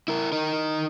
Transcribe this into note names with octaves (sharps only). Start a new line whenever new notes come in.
E4 A#4
D#4 A#4